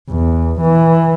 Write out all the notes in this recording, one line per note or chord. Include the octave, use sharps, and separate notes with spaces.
E2
E3